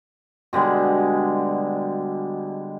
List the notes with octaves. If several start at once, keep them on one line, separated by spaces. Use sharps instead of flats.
B2 D3 G3 G#3